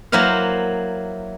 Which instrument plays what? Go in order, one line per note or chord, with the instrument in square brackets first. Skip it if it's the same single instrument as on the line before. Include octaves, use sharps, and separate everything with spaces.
[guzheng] F#3 A#3 E4 C5 F5